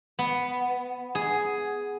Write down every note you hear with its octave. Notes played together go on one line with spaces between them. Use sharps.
B3
G#4